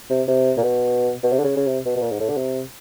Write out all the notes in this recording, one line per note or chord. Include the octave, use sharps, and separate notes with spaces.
C3
C3
A#2
B2
B2
C3
D3
C#3
C#3
C3
B2
B2
A#2
G#2
A2
D3
C3